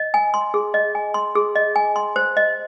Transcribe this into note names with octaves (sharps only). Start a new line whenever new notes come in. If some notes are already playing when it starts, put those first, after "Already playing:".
Already playing: D#5
G#5
C6
G#4
D#5
G#5
C6
G#4
D#5
G#5
C6
C5
D#5